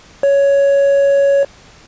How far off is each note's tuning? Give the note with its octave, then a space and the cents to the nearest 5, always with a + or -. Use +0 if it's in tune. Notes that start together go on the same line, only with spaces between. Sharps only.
C#5 +10